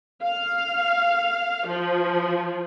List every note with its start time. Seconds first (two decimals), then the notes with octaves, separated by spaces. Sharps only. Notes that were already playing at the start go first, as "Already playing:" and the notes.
0.23 F5
1.66 F3